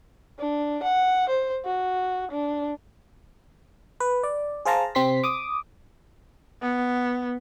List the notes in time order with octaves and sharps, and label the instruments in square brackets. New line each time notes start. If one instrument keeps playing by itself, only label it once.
[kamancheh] D4
F#5
C5
F#4
D4
[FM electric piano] B4
D5
G#4 C5 F5 A5 A#5
C3 C4 C6 B6
D6 D#6
[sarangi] B3